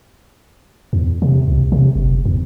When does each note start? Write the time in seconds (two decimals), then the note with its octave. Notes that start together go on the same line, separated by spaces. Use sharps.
0.93 E2
1.22 C3
1.48 C2
1.72 C3
1.96 F#1
2.26 E2